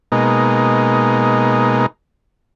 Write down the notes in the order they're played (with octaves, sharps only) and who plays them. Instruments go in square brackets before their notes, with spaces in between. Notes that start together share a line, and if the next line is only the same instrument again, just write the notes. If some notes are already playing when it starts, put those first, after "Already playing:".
[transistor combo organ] B2 G#3 A#3 D#4